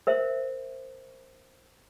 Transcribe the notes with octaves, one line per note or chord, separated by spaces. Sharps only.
A#4 C5 E5